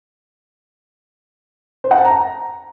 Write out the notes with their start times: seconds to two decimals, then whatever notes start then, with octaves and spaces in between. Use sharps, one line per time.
1.84 C5
1.91 F#5
1.98 A5
2.05 A#5